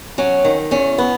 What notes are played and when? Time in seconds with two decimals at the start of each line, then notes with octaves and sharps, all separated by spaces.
0.18 F#3 C#4
0.45 D#3
0.71 E2 C#4
0.98 B3